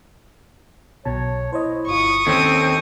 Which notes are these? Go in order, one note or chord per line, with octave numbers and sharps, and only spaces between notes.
B1 B2 C#5 A5
E4 C5 C#5 D#5
G1 F4 C#6 D#6
D#2 C4 C#4 A4 C5 C#5